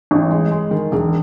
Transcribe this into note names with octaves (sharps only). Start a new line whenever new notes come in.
A1
G#3
G#3
D#3
E1